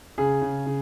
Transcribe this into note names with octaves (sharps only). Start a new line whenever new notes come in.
C#3 G#4
C#3
C#3